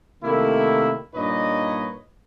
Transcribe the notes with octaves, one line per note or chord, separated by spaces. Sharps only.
C3 D#3 A3 A#3 E4
G2 A#2 D#4 B4 C#5 D#5